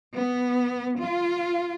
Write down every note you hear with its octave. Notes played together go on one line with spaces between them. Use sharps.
B3
F4